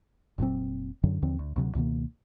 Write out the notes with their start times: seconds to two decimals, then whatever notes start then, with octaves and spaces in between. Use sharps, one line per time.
0.38 F1 A#2 F#3 C4
1.03 F#2 D3 F#3
1.22 D#2 D3 F3 C4
1.39 D2
1.56 D2 C3 F#3
1.75 C#2 B2 D#3 A#3